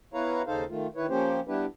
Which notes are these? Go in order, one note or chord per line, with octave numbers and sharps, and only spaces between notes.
B3 E4 B4 C#5 F5 A#5
D#2 C#3 D#4 A4 C5 F5
D#3 A3 F4
D#3 E4 B4 C#5
F3 A#3 C#4 G4 C5
G3 B3 D4 E4 G4 B4